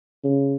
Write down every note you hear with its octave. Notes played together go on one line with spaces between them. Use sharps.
C#3